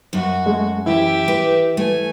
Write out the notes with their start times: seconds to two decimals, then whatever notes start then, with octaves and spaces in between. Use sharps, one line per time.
0.13 F#2 F#4
0.46 G#3 A3
0.86 E3 E4 G4 E5
1.28 B4
1.77 A3 G#5